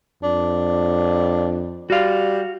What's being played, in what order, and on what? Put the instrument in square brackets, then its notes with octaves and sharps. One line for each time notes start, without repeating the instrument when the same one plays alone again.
[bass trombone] F2 [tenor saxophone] D4
[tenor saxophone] G3 [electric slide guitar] F#4 F5